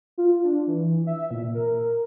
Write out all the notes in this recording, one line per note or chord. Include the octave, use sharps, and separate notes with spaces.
F4
D4
E3
E5
A#2
A#4